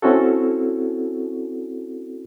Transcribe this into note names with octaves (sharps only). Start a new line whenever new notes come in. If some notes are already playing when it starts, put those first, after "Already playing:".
C4 C#4 E4 F#4 A4